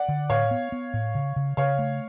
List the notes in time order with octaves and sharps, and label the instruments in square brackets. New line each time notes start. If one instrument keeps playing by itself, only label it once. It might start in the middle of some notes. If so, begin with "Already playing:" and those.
Already playing: [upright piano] D5 F#5
[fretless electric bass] D3
[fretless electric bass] A2 [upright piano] C#5 F5
[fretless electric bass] B3
B3
A2
C#3
C#3
[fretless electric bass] C#3 [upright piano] C#5 F5
[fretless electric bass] A3